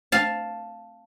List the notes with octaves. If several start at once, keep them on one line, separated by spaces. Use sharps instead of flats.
F5 A5